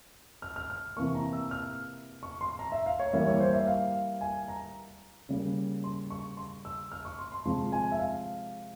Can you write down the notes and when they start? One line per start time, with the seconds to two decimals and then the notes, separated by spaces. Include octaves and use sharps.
0.42 F6
0.56 F6
0.70 F6
0.97 C3 E3 A#3 C#6
1.15 A#5
1.33 E6
1.51 F6
2.23 C#6
2.41 C6
2.59 A#5
2.72 E5
2.86 F5
2.99 C#5
3.13 E3 G3 A#3 E5
3.27 C#5
3.40 C5
3.53 E5
3.67 F5
4.21 G#5
4.48 A#5
5.29 C#3 G3 A#3
5.84 C6
6.10 C#6
6.37 C6
6.65 E6
6.92 F6
7.05 C#6
7.19 C6
7.32 C6
7.45 C3 F3 G#3 C6
7.72 G#5
7.92 E5
7.99 F5